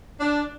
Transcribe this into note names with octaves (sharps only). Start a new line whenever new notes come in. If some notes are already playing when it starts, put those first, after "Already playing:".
D4